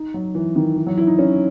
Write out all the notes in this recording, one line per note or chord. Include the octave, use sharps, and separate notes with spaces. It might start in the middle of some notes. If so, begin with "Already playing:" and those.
Already playing: D#4
F#3
E3
D#3
E3
F#3
E4
D#4
C#4